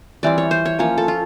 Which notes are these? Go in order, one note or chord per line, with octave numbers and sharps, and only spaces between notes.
E3 G3 C4 D5
C#5
C5
C#5
F3 A#3 C#4 C#5
A4
F4